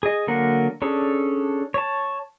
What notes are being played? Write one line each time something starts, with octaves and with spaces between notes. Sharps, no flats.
G#4 D#5
D3 F#3 A#3 A#4 F#5
C#4 D4 G#4 A4
C#5 A5